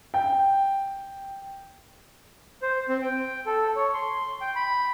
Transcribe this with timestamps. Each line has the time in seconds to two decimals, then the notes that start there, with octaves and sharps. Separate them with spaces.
0.14 G5
2.62 C5
2.89 C4
3.02 G5
3.46 A4
3.76 C#5
3.94 C6
4.41 G5
4.56 B5